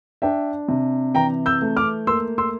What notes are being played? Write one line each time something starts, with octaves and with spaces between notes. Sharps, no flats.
D4 E5 G5
C3
E3 G5 A#5
E6 G6
A3
D6 F6
A#3 C6 E6
C6 E6